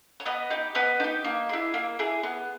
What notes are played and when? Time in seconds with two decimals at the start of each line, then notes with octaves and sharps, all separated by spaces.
0.20 C#5
0.25 B3 B4 D#5
0.50 D#4 G4
0.75 B3 B4 D#5
1.00 D#4 G4
1.24 A#3
1.49 E4 G#4
1.74 A#3
1.99 E4 G#4
2.23 B3